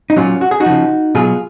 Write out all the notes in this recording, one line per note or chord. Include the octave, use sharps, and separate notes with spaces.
D#4
A#2 F#3 C#4 F4
F#4
G#4
D#4 F#4
C#3 F3
B2 F#3 F4 G#4